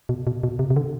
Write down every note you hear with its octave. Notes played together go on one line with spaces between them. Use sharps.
B2
B2
B2
C3
C3
D3